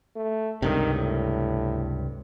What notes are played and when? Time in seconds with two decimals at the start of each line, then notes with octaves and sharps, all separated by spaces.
0.16 A3
0.62 C#2 G2 C3 D#3
0.94 A2